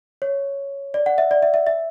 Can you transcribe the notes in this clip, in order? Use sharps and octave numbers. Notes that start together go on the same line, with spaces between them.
C#5
D5
F#5
E5
D5
E5
E5
E5